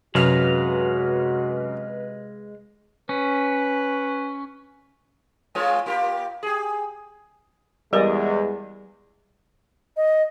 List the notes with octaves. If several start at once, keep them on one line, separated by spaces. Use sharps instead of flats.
F#2 C3 G#3 F#4 B4 F5 A#5 F6
C#4 B4
G#3 F4 C#5
A#3 F4 G4
G4 G#4
E2 G3 G#3 G4 A#4 D5 D#5
D#5